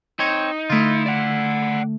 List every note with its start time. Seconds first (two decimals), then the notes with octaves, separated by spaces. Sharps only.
0.19 C4 D#4 C#5
0.70 D3 A3 E4 F4
1.06 D5 F#5